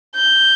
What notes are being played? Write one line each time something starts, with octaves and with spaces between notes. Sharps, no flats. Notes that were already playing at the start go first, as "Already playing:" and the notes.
G6